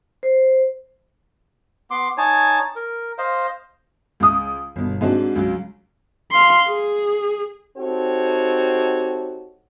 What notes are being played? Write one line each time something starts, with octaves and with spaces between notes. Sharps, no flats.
C5
B3 C6 D6
D#4 C#5 G#5 A5
A#4
C5 D#5 F5
C#2 D#6
G1 B2
G#2 G#3 C4 D4 F#4
C#2 F#3
F5 C6
G#4
C4 D#4 F#4 G4 A4 C#5